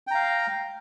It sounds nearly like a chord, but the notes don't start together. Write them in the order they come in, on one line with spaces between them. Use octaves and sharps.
G5 A#5 F5